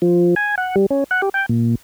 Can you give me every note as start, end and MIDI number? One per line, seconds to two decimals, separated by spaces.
0.02 0.35 53
0.36 0.55 80
0.58 0.75 78
0.76 0.86 55
0.90 1.04 61
1.11 1.21 78
1.22 1.29 67
1.34 1.46 79
1.49 1.75 46